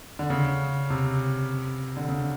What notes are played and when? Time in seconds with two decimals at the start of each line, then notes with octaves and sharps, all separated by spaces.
0.19 D3
0.30 C#3
0.90 C3
1.97 D3
2.08 C#3